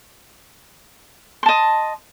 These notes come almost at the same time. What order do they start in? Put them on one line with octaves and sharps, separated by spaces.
C6 A5 D#5